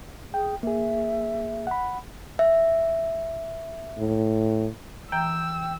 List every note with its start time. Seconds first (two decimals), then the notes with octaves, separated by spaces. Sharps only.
0.34 G#4 G5
0.63 A#3 G#4 E5
1.67 F#5 B5
2.39 E5
3.98 A2
5.12 E3 G5 A#5 E6